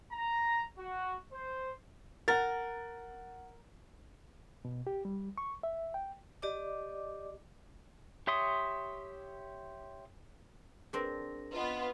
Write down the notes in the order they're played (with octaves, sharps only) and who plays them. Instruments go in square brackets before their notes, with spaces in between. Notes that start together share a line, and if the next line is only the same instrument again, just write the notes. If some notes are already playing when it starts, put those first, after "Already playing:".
[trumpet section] A#5
F#4
C5
[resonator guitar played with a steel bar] A#4 [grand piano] F#5 A6
[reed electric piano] B2
G4
G3
C#6
E5
G5
[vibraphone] G4 D5 D#5 D6
[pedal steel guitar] G4 C#5 E5 C6 D#6
[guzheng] C4 D4 [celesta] G#4 A#4 A#6
[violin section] B3 F4 [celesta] B4 D#5